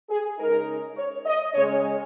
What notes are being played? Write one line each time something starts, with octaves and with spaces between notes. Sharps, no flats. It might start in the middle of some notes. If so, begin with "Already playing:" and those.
G#4
C#3 G#3 D#4 A#4
C#5
D#5
C#3 G#3 C#4 C#5